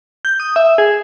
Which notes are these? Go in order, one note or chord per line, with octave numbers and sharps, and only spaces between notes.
G6
D#6
E5
G#4